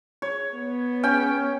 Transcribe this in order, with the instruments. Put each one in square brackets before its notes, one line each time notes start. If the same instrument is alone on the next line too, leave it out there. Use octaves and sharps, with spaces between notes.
[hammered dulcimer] C#5
[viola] B3
[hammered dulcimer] C#4 G5